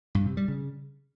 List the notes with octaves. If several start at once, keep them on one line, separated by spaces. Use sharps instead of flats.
G2
C3
G3
C#3